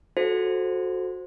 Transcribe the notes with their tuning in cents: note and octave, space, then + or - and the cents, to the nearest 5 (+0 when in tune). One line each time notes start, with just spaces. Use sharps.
F#4 -15 A4 -15 C5 +0